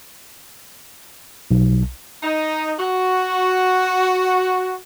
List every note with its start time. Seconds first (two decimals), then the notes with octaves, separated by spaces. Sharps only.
1.51 B1
2.23 D#4
2.78 F#4